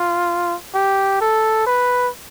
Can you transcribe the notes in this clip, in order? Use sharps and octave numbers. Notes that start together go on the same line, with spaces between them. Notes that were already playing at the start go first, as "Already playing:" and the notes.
Already playing: F4
G4
A4
B4